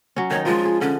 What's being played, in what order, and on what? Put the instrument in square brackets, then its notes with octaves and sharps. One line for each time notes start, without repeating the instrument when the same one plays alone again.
[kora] F#3 C#4
[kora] D#3 D#4 [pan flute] C#5
[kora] F3 G#3 [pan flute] F4
[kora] G#4
[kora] D3 [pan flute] C#4